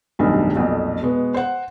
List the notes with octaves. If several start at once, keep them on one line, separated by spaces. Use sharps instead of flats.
F1 B1 G2 D#3 D4 D#5
B1 F2 A#2
B2 G#3 B3
C5 F#5